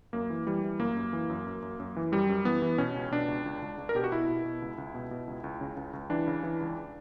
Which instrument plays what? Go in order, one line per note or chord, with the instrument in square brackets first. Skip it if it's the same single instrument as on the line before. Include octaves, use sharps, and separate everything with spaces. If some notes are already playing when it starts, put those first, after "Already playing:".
[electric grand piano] F#2 A#3
E3
E3 G3
E3
F#2 A#3
F#2
E3
F#2
F#2
F#2
F#2
E3
F#2 G3
F#2
E3 B3
E3
B2 C#4
C#2
B2 D4
C#2
C#2
C#2
C#2
A#4
B2 G4
F#4
B2 E4
B2
B2
C#2
C#2
B2
B2
C#2
C#2
C#3
C#2
C#2
E3 D4
C#3
E3
C#2